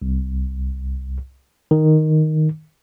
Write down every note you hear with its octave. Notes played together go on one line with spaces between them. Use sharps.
C2
D#3